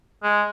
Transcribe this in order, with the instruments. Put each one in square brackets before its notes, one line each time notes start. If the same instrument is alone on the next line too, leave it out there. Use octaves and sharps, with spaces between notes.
[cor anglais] G#3